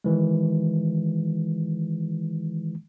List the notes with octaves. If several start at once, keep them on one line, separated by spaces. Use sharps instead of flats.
D#3 E3 G#3